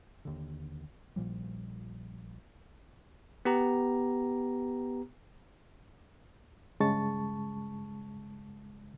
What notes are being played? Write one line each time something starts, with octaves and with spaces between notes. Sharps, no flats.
D#2 D3
A#1 A#2 F3 G3
B3 G4 A#5
G2 C#3 G#3 A5 C#6 A6